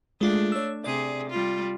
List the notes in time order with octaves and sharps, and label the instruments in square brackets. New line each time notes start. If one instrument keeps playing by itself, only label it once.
[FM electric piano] G#3 F4 [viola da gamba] A3 D4
[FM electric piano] C#5 E6
[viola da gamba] C3 G#4 [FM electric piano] D5
[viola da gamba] G3 F4